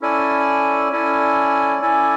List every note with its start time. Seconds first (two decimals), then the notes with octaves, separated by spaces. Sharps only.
0.01 C#4 E4 A4 D5 G#5
0.92 C#4 E4 A4 D5 G#5
1.82 C#4 E4 A4 D5 G#5